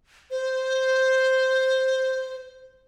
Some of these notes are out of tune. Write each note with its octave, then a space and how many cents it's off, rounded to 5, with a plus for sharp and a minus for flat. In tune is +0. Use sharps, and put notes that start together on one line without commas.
C5 +0